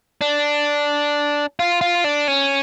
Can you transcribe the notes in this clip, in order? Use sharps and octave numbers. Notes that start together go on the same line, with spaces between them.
D4
F4
F4
D4
C#4